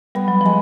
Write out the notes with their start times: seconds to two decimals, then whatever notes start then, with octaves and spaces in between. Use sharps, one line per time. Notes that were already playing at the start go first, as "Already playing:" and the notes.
0.15 G3 B3
0.28 F#3
0.41 F3 G#3